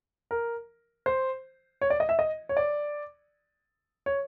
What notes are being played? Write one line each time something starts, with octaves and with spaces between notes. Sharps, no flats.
A#4
C5
C#5
D5
D#5
E5
D#5
C#5
D5
C#5